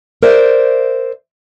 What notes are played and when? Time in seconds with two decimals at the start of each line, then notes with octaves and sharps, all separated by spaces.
0.23 A#4 C5 D5 E5